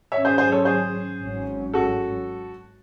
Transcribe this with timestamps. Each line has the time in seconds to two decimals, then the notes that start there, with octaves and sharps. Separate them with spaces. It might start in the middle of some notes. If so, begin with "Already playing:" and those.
0.12 G#2 D#3 F#3 C#4 C#5 E5
0.25 G#4 C5
0.38 G#4 C5
0.52 A4 C#5
0.65 G#4 C5
1.19 G#1 G#2 F#3 C#4
1.74 F#4 A4